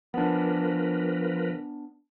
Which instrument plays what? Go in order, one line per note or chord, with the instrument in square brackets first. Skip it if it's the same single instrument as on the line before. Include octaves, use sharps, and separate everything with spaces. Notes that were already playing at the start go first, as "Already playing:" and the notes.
[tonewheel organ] F3 A#4 B4 [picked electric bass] B3 D4